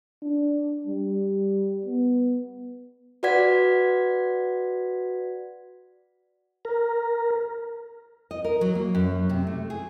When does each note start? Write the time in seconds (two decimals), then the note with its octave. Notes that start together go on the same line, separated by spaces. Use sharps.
0.22 D4
0.87 G3
1.86 B3
3.23 F#4 B4 D5 F#5 G#6 B6
6.65 A#4
8.31 D#5
8.44 A#4
8.61 F#3
8.75 A#3
8.95 F#2
9.29 C3
9.47 A3
9.70 G#4